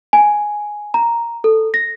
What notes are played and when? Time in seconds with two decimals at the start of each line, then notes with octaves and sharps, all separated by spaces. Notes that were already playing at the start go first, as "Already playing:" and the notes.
0.13 G#5
0.94 A#5
1.44 A4
1.74 A#6